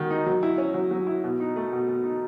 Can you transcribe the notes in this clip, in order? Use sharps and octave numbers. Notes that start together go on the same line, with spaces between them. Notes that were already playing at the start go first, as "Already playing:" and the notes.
Already playing: D#3 G#3 F#4
D#4
F#3
E4
C#4
F#3
F#3
E4
B2
D#4
A3
B2
B2
D#4